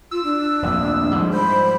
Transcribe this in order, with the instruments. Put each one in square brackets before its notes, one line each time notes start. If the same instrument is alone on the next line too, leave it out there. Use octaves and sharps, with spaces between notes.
[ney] F4 [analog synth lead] E6
[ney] D4
[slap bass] F1 A#1 D#2
[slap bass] G#2 F3 G3 [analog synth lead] G#3
[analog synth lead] C5 [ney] B5